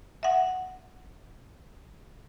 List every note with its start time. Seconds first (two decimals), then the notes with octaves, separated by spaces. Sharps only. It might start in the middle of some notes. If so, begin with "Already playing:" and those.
0.23 E5 F#5